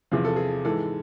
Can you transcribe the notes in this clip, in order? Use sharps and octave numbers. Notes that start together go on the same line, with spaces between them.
E2 C3 F3 G#4
A4
G#4
G#2 E3 G#3 A4